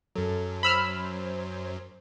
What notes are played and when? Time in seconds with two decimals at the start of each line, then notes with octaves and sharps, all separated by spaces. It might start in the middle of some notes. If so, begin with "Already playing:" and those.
0.16 F#2 F#3 A4
0.63 C5 B5 E6 F6